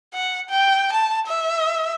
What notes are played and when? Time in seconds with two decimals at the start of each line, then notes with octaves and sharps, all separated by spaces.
0.14 F#5
0.49 G5
0.92 A5
1.27 E5